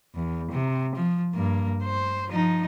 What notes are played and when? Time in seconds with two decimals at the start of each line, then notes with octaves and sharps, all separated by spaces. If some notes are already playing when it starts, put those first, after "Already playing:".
0.15 E2
0.51 C3
0.96 F3
1.34 G2 A#3
1.83 C5
2.28 F3 D#4